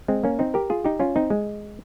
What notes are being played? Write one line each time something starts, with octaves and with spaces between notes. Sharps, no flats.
G#3 C4
A#3 C#4
C4 D#4
G4 A#4
F4 G#4
D#4 G4
C#4 F4
C4 D#4
G#3